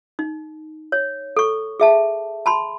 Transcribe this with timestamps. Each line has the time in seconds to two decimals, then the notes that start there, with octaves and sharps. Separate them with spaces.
0.19 D#4
0.92 C#5
1.36 A4 C#6
1.80 G#4 E5 A5
2.46 A5 B5 C6